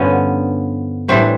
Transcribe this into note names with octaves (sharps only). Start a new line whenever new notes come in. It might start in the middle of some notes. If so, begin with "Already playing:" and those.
Already playing: G2 D3 F3 B3 C#4
A2 E3 G3 C4 D4